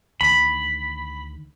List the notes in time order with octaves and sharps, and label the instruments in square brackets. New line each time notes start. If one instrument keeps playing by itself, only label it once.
[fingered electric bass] D2 D#3 [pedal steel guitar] B5